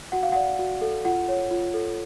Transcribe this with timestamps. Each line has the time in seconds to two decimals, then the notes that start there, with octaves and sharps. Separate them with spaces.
0.12 F#4 F#5
0.23 F5
0.32 D5 F#5
0.59 F#4
0.82 A4
1.05 F4 F#5
1.28 C#5
1.51 F4
1.74 A4